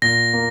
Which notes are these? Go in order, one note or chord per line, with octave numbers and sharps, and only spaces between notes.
A#2 A#6
A#3